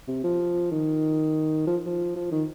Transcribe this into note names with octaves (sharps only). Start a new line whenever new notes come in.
C3
F3
D#3
F3
F3
F3
D#3